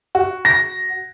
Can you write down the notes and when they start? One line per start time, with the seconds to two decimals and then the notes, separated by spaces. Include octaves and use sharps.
0.15 F#4
0.45 A#6